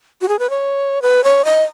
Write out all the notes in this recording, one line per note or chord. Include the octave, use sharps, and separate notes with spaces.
F#4
G#4
B4
C#5
B4
C#5
D#5